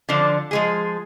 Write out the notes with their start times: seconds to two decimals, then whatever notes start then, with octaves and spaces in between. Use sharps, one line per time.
0.09 D3 F3 D4
0.51 F3 G#3 G#4